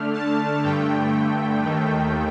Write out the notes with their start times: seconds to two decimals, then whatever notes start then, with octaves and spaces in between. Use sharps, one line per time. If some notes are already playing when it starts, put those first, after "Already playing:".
Already playing: D3 A3 D4 F6
0.13 A5
0.63 G2 D3 A3 G5
1.63 D#2 D#3 A3